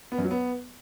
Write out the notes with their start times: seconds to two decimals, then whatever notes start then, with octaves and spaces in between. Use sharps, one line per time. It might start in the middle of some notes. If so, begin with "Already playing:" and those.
0.12 B3
0.18 F#2
0.24 F#3
0.31 B3